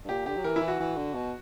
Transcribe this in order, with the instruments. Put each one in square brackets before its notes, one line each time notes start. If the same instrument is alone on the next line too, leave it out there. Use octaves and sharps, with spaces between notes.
[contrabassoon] G2
[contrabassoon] A#2 [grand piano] G4
[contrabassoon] D3 [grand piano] G4
[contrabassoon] F#3
[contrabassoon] E3 [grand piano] A#4
[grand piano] E4
[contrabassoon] E3
[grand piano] F#4
[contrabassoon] E3
D3
B2